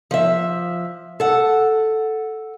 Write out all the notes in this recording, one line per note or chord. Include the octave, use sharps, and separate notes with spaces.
F3 E5
A4 F#5